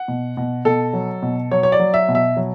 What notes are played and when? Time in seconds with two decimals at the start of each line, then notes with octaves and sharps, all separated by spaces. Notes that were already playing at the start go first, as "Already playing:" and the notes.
Already playing: F#5
0.08 B2
0.37 B2
0.65 B2 A4
0.93 F#3
1.23 B2
1.51 F#3 C#5
1.63 C#5
1.72 D5
1.79 F#3
1.94 E5
2.09 B2
2.15 E5
2.37 F#3